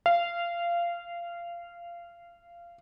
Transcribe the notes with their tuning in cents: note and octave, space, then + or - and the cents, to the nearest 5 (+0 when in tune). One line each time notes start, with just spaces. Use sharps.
F5 -20